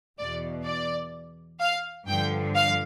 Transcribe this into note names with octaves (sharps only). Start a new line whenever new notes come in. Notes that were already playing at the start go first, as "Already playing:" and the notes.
E2 B2 D5
D5
F5
G2 D3 F3 G5
F5